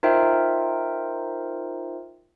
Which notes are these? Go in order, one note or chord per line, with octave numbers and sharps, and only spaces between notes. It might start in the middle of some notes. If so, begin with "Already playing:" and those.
D#4 F4 A#4 C5 E5 G5